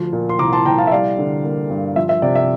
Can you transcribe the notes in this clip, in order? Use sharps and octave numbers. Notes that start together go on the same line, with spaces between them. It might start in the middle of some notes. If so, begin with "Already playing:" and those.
Already playing: D2 F3
A#2
C6
C2 A#5 D6
A5 C6
C2 G5 A#5
F5 A5
E5
G3 D5 F5
D3
A#3
G2
F3 E5
E5
C3 D5
E5